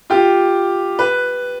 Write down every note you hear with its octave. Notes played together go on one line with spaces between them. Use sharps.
F4 G4
B4